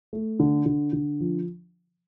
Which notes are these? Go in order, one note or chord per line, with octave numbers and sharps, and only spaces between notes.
A3
D3
D3
D3
F3